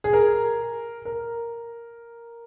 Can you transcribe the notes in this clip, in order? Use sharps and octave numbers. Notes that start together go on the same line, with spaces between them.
G#4
A#4
A#4